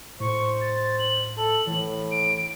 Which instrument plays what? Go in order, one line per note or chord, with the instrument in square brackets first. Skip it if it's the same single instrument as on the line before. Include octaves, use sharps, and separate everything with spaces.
[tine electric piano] A2 [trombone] C5 [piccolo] C#6
[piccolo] A6
F#7
[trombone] A4 [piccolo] F#7
[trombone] A2 [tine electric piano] E3
[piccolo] D7